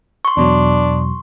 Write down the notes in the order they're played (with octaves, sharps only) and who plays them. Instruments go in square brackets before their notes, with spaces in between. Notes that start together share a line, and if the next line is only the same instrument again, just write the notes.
[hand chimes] C6 C#6
[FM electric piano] E2 B2 F#3 [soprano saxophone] D4